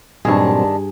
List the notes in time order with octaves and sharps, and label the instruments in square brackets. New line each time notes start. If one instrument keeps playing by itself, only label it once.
[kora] G2 G#4 [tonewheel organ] A#2 F#3 C4 [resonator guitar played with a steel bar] D#3 D4